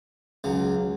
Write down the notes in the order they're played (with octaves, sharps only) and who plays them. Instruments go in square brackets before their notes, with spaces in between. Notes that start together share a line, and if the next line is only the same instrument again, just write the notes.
[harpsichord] C#2 C#3 F#3